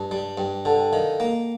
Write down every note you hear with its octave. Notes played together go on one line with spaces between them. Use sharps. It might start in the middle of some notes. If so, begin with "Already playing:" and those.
Already playing: G2 A5
G3
G2 G5
D3 A5
G5
D#3 F5
A#3